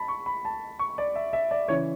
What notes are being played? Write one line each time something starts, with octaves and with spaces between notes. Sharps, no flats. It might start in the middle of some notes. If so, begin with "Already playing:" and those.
Already playing: A5 B5
C#6
B5
A5
C#6
D5
E5
E5
D5
C#3 E3 C#5